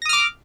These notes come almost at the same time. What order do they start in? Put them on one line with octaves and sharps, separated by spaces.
A#6 D#6 F6 D6